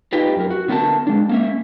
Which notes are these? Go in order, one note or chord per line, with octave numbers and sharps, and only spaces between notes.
D#4 F4 G4 B4
F#2 A#4
F#4
D3 B3 A#4 F#5 A5
G#3 D4
A#3 C#4 E5